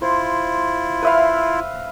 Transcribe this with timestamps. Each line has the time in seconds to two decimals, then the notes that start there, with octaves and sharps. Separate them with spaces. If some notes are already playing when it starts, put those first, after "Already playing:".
0.02 E4 F4 C5
1.02 B4 E5 F5